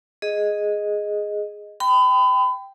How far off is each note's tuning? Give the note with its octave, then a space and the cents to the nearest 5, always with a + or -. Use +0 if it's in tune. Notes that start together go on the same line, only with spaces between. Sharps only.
G#4 +0 D#5 +0
G5 +0 B5 +35